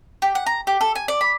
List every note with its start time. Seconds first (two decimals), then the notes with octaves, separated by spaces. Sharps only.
0.22 G4
0.35 F#5
0.46 A#5
0.67 G4
0.81 A4
0.95 G#5
1.08 D5
1.21 B5